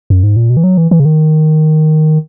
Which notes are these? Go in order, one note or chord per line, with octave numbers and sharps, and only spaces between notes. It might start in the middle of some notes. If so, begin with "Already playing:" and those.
F#2
G#2
A#2
B2
E3
F#3
E3
E3
C#3
D#3